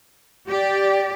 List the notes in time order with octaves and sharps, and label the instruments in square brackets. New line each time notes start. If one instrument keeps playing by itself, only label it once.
[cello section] G4 D5